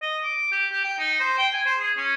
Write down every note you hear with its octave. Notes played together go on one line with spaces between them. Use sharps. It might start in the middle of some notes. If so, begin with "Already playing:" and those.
D#5
D6
G4
G4
G5
D#4
C5
G5
G#5
C5
G#4
C#4